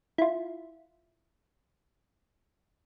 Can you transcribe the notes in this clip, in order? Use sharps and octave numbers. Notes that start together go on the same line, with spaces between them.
E4 F4